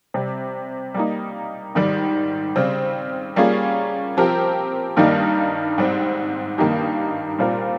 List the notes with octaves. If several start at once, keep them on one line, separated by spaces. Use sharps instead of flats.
C3 G3 C4
G3 A#3 D#4
G#2 D#3 G3
C#3 G3 C4
G3 A#3 C#4 F4 G#4
F3 C4 G4 A#4
G2 D#3 G3 A#3 D#4
G#2 G3 C4
G2 D#3 A#3 D#4 G4
A#2 G3 C4 F4 A#4